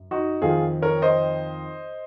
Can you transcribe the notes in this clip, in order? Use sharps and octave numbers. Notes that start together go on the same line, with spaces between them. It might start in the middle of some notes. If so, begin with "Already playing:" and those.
Already playing: F#2
D#4 F#4
F2 D#3 F4 G#4
A#4 C#5
C5 D#5